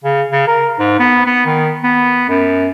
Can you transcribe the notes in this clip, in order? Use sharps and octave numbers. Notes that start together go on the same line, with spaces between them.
C#3
C#3
A#4
G#2
B3
B3
D#3
B3
F#2